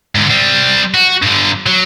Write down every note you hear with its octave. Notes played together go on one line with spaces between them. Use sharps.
G#2 D3
G3 C4
F#4
G2 D3
F#3